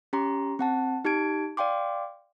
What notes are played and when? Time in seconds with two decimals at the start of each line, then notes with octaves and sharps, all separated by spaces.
0.13 C#4 G4 A#5 C6
0.59 C4 F#5 A5
1.05 D#4 G4 A5 G#6 D7
1.57 D5 F5 G5 C6 D6